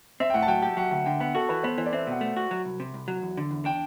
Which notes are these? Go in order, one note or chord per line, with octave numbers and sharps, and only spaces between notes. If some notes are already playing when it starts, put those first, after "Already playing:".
C4 E5
G5
A2 F#5
A5
F#3 G5
G4 G5
F#3 F#5
D2 F#5
D3 G5
B3 F#5
F#4 A4
E3 B4
B3 C5
E3 C5
D5
C4 E5
B2 F#5
A3
F#4
F#3
C2
C3
C2
F#3
E2
D3
E2
D4 G5